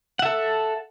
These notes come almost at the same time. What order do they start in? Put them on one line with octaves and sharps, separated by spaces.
F#5 E5 A4